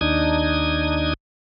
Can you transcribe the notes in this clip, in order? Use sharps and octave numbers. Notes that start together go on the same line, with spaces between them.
D#2 D4 D#4 D#6 G#6